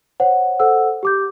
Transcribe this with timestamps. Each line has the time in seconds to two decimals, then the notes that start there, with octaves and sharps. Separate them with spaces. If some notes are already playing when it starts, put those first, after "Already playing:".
0.20 C5 C#5 F#5
0.60 A4 C5 F#5 E6
1.03 G4 D6 G6